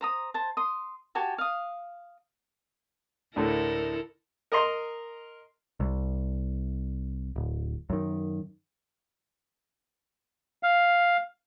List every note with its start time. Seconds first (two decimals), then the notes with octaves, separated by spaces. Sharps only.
0.01 C5 A#5 D#6
0.34 C5 A5
0.57 C6 D#6
1.15 F#4 G4 G#5 A5
1.38 F5 D#6
3.36 D2 A2 D3 E4 A4 A#4
4.52 A#4 D#5 A#5 C6
5.80 C2
7.36 D1
7.90 F#2 D#3
10.63 F5